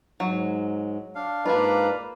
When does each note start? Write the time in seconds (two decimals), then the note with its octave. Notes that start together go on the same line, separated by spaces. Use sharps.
0.20 G#2 F#3
1.15 D4 F5
1.46 G#2 A#3 F4 B4 D5 A#5